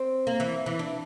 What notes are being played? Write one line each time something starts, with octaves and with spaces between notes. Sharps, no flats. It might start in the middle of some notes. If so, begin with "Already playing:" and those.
Already playing: C4
A#3
E3
E3
D4